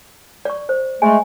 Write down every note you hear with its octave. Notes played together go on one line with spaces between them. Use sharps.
D5 C#6
C5
G#3 A3 G#5